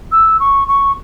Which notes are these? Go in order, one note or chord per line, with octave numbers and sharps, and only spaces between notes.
E6
C#6
C#6